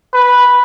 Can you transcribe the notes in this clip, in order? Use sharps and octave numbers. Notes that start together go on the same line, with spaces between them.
B4